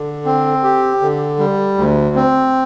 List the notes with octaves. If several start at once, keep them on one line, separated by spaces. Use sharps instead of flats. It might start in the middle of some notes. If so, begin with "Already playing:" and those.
Already playing: D3
C4
G4
D3
G3
D2
C4